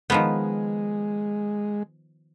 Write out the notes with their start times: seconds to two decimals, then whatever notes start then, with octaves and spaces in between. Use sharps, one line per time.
0.10 D#3 F3 G#3 B3